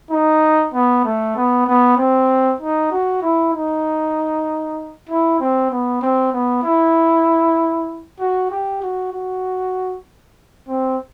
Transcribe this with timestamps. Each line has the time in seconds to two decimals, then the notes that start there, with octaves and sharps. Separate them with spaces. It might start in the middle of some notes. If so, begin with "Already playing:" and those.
0.11 D#4
0.74 B3
1.05 A3
1.36 B3
1.67 B3
1.97 C4
2.60 D#4
2.91 F#4
3.22 E4
3.54 D#4
5.09 E4
5.40 C4
5.71 B3
6.02 C4
6.33 B3
6.63 E4
8.20 F#4
8.50 G4
8.82 F#4
9.13 F#4
10.68 C4